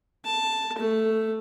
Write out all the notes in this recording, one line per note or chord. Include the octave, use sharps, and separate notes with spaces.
A5
A3